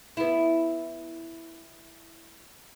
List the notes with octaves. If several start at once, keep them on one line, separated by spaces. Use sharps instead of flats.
B3 E4